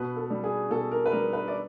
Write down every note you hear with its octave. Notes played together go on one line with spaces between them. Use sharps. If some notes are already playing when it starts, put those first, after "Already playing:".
Already playing: B2 B4
A4
G3
G#4
B2 A4
A#4
B4
G3 A#4
B4
D5